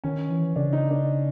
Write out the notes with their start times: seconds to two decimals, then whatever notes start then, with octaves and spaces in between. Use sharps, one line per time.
0.04 D#3 C#4
0.30 E3
0.56 C#3 D4
0.73 D#4
0.91 D4